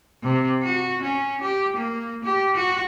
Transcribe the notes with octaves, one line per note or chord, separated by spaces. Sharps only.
C3
F#4
C#4
G4
A#3
G4
F#4